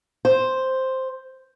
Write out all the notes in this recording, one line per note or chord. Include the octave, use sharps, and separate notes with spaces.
C5